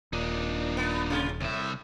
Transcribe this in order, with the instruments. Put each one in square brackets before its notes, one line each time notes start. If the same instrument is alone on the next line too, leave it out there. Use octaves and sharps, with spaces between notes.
[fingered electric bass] D#1 [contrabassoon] A#2 [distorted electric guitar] D4 D#4
[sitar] B3
C3 F4
[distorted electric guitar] C2 E5 [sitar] A2